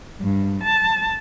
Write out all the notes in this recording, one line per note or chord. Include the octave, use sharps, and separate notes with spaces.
G2
A5